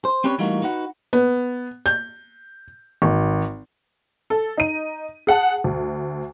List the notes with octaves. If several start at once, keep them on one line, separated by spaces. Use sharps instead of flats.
C5
C4 C#4 G4 B4 C#5 D5
E3 G3 A3 A#3 D#4 F#4
D#4 F#4 B4 F#5
B3
G6
G#1
A4
D#4 D#7
G#4 F#5 A5
D2